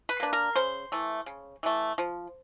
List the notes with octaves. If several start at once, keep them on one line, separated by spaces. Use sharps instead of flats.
B4
A#3 D4
A#4
C#3 C5
E3 A3
C#3
E3 A3
F3